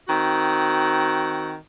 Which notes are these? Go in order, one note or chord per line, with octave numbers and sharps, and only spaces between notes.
D#3 C4 F#4